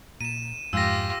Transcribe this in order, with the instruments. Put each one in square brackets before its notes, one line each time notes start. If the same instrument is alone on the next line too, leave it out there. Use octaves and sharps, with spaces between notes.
[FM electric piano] A#2 [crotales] D#7 E7
[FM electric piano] F2 G#2 [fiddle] F4 G4 [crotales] E6 A#6